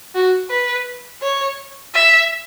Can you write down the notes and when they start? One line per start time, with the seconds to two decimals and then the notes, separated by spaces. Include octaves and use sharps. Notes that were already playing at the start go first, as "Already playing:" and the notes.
0.15 F#4
0.50 B4
1.22 C#5
1.94 E5